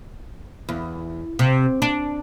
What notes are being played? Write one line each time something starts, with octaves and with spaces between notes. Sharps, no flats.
E2
C3
D4